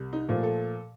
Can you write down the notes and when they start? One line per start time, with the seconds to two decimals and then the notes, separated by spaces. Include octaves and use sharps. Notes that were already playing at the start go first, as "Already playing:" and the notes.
Already playing: C2
0.13 D#4
0.28 A#2 F3 A3
0.43 A4